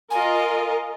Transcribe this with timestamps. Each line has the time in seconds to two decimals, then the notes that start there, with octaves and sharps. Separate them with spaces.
0.11 F4 A#4 D#5 G#5